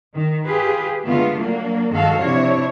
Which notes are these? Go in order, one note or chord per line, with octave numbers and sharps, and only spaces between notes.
D#3
F4 G4 G#4 B4
D3 G#3 A3 B3 F4
F#3 A#3 D4
G2 D#3 G#3 F#4 A4 F5
C3 F3 D4 E4 C#5